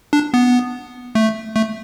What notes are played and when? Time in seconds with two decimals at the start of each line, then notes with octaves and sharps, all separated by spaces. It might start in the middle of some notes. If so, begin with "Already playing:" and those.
0.13 D4
0.34 B3
1.15 A3
1.56 A3